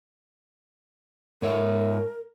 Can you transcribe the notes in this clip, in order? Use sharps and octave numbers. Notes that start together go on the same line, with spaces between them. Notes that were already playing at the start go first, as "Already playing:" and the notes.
G#2 A#4 C#5 E5